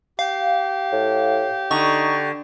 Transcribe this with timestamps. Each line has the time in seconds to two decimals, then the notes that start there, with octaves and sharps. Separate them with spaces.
0.19 G4 F5
0.92 A2
1.71 D3 D#4 C#6